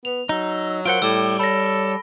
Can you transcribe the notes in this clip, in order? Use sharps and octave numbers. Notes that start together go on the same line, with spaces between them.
B3 B4 F7
F#3 D#4 E6
F4 A#4 C5 F#5 D7 G7
A2 G3 D6 E6
A4 C#5 B5 A#6